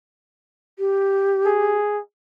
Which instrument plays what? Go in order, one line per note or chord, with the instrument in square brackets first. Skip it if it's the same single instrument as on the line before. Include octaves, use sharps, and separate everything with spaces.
[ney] G4
[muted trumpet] G#4